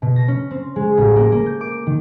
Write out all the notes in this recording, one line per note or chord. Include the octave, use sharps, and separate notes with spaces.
B2
A#6
C#4
C4
G#3
A1
A#3
A#3
G6
D6
D#3